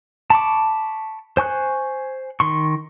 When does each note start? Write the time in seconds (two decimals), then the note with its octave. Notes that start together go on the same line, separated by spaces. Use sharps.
0.30 A5 B5 C#6 D6
1.37 C5 G#5 C#6 F#6
2.40 D#3 C6 C#6